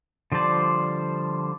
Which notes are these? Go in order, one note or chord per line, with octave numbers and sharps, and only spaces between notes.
D3 F3 G3 C5 D5